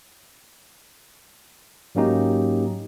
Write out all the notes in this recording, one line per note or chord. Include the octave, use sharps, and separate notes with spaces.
G#2 F#3 A#3 C#4 D#4 G4